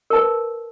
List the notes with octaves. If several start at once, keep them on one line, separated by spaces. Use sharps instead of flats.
A#4 B4 A5